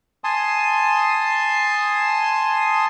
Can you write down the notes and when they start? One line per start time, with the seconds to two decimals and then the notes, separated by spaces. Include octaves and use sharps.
0.24 G#5 A5 C6 D#6